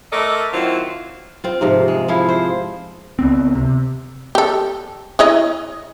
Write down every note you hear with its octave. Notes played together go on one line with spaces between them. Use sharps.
A3 A4 A#4 D5 D#5
D#3 F#3 C4 E4 F4
C4 F4
G#2 C3 F3
G#3
F3 E4 F5
C5
C#2 B3 C4
C3
G4 A4
E4 C#5 D#5